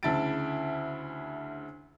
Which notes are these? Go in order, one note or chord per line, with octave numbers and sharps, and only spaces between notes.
D2 C#3 E4 A5 A6 D7